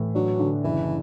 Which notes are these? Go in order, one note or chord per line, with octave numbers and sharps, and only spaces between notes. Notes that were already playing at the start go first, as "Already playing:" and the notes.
Already playing: A2 E3
F#3 D4
D3
F#1 E3